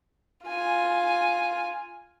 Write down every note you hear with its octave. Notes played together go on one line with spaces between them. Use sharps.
F4 G#5